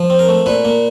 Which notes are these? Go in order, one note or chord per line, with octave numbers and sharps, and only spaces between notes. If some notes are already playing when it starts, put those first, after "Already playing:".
Already playing: F3
C4
A#4
A3
A#2 B4
A#3